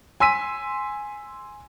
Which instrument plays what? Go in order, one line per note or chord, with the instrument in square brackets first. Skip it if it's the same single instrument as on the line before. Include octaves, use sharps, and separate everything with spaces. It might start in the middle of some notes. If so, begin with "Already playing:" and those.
[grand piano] G#5 C6 E6 B6 D#7